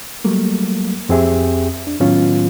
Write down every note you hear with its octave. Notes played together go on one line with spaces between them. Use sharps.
F#3 G3 A3 A#3
F2 C4 G4 G#4 E5
D4
A2 D#3 F#3 B3 C#4 F4